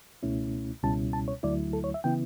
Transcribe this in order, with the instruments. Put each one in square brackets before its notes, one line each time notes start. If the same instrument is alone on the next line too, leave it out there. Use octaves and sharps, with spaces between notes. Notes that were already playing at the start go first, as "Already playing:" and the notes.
[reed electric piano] C#2 B2 A3 C#4 E4
C#2 B2 G3 C#4 E4 A5
A5
C#5
D2 D3 F#3 A3 E4 D5
A4
C#5
E5
C#3 E3 B3 E4 G5